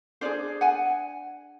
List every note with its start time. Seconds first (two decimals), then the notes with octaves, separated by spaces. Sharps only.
0.21 D4 F4 G#4 C5 D5
0.61 F#5 G#5